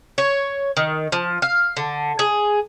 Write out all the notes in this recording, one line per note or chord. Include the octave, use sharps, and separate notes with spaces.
C#5
D#3
F3
F5
D3
G#4